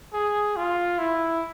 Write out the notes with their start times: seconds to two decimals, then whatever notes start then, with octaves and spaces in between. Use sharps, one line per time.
0.13 G#4
0.56 F4
0.99 E4